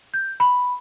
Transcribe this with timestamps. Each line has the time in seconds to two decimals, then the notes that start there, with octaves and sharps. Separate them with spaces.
0.14 G6
0.40 B5